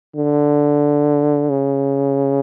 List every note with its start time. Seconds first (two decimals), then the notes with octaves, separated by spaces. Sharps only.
0.16 D3
1.49 C#3